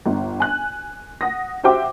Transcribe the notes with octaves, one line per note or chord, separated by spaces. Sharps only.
G1
G#5 F#6
F#5 D#6 A#6
F#4 G4 C5 E5 G5 D6